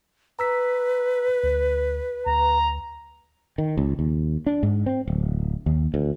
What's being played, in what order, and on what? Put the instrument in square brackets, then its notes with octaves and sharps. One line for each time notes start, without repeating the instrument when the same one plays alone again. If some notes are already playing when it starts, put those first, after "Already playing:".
[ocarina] B4 [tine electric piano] A#5 E6 B6
[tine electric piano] D2
[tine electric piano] D2 [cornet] A#5
[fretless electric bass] D#3
C#2
D#2
D4
G#2
C4
D1
D#2
D2